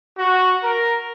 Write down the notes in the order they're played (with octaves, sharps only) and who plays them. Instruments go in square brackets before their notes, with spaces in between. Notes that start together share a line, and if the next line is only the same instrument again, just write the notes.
[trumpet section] F#4
A#4